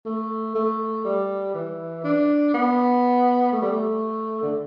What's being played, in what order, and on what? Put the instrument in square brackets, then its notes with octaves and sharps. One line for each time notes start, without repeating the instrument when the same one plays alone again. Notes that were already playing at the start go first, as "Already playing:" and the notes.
[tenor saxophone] A3
A3
G3
E3
D4
B3
A3
G3
A3
D3